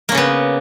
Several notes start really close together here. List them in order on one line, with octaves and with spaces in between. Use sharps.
A#3 C#4 C#3 B3